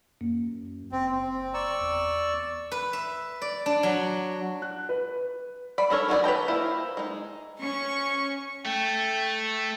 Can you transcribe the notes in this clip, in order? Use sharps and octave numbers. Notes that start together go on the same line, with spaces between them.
F#2 A#3
F#1 C4
C4
D5 A#5 C#6 E6
E2
B4
E5
D5
D4
F#3
F#6
B4
D5 B5
C#4 A4 A#4 C#5
D#3 C#4 F#4 G#4 D5
B4 C#5 G5 A#5
A#3 E4 F4 C5
G#3 D#4
C#4 C#6
A3 G5